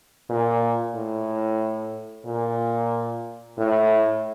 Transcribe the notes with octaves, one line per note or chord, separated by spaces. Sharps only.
A#2
A2
A#2
A2